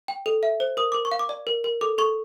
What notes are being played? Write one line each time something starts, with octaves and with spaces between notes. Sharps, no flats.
G5
A4
E5
C5
A#4 D#6
A#4 D6
C#6
F5
D6
D5
A#4
A#4
A4 D6
A4 C#6